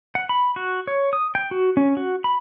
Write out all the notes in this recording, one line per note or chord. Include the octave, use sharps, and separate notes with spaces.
F#5
B5
F#4
C#5
D#6
G5
F#4
C#4
F#4
B5